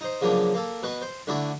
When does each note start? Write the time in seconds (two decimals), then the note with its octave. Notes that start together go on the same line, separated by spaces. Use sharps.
0.01 D#4 C5
0.22 C#3 F3 F#3 A#3 D4
0.54 A#3 A4
0.83 B2 B4 F#5 C#6
1.02 C5
1.27 D3 A3 D4 E4 F#4 D5